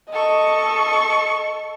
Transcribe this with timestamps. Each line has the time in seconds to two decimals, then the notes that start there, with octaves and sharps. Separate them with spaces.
0.12 A4 D#5 C#6